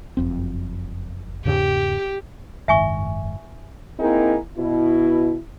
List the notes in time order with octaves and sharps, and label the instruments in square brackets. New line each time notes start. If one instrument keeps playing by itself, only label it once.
[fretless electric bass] F#1 F2 C4
[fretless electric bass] E2 G#2 C#3 [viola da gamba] G4
[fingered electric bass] F#1 G#2 D#3 [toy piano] E5 G#5 C#6
[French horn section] A#3 C4 D#4 E4 G#4 A#4
B2 E4